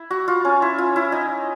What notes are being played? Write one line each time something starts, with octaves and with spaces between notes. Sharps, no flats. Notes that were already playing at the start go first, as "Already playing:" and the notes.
Already playing: E4
F#4
F4
C#4
E4
F4
E4
D#4